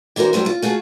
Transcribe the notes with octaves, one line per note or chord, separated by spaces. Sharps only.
E3 D4 F#4 A#4 C5
F#3 G3 A3 C5
F4
A3 F4 F#4 G#4